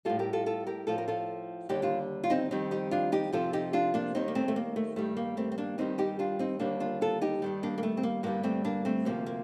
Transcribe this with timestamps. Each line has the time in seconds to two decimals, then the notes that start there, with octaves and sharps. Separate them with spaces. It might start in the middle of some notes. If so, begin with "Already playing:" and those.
0.05 A2 G3 F4 A4
0.19 G4 A#4
0.33 F4 A4
0.46 F4 A4
0.67 G4 A#4
0.87 A2 F3 F4 A4
0.98 A#4
1.08 F4 A4
1.69 D#2 D3 G3 D#4 G4
1.82 D4 F4
2.24 F4
2.30 C4 D#4
2.51 F2 D#3 G3 C4 D#4
2.71 D#4 G4
2.91 D4 F4
3.12 D#4 G4
3.33 F2 C3 F3 F4 A4
3.53 D#4 G4
3.73 D4 F4
3.94 A#3 D4
4.15 D#2 D#3 G3 C4 D#4
4.28 A#3
4.35 A3 C4
4.48 A3
4.56 A#3
4.76 A3
4.96 G2 D#3 G3 A3
5.17 A#3
5.37 A3 C4
5.52 C4
5.58 A#3 D4
5.78 G2 D#3 G3 C4 D#4
5.98 D#4 G4
6.19 D4 F4
6.39 C4 D#4
6.59 D#2 D3 G3 A#3 D4
6.80 D4 F4
7.01 F4 A4
7.21 D#4 G4
7.42 G2 D#3 G3
7.63 A#3 D4
7.78 A#3
7.83 A3
7.97 C4
8.03 A#3
8.23 G2 D3 G3 A#3
8.43 A3 C4
8.65 A#3 D4
8.85 A3 C4
9.05 D2 C3 F3 A#3
9.26 A#3